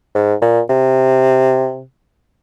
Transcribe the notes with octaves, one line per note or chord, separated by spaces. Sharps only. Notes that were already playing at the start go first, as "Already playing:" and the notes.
G#2
A#2
C3